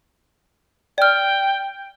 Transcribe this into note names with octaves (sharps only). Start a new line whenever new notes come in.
D5 G5 F6